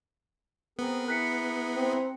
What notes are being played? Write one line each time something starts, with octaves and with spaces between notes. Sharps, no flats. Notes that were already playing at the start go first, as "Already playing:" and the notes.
B3 C4 G#4 A#4
E4 G#4 A#5 F#6 B6 C#7
C4